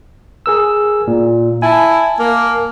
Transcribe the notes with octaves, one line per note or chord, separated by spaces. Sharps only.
G#4 A#4 E6
A#2
E4 G#5 A5
A#3